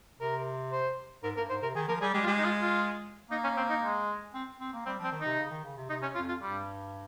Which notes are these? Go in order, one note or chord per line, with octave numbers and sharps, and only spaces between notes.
C3 A#4
C5
G#2 A#4
G2 A#4
G#2 C5
C3 A#4
D#3 G#4
F3 A#4
G3 G#4
G#3 G4
F4
G#3 G4
D#4
F4
F4
A#3 D#4
C#4
C4
D#4
G#3
C4
C4
A#3
G3 C4
F3
C4
D#3
C3 D#4
C#3
D#3
C#3
C3
C3 D#4
C#4
F2 F4
F4
G2 G3